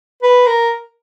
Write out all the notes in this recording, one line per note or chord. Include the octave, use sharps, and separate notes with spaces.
B4
A#4